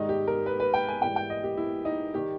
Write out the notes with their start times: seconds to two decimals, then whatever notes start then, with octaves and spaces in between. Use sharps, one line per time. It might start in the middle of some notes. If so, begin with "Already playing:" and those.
Already playing: G#2 D#3 G3 D#4
0.09 G4
0.27 A#4
0.46 B4
0.60 B4
0.74 G5
0.88 G#5
1.01 G#2 E3 G3 G5
1.16 G5
1.30 D#5
1.44 G4
1.57 E4
1.85 D#4
2.14 D#3 G3 G4